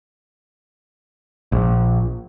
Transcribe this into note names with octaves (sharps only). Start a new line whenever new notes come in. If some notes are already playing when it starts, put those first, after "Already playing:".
A#1